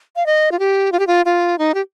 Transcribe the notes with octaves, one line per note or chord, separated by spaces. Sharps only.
F5
D#5
F4
G4
F4
G4
F4
F4
D#4
G4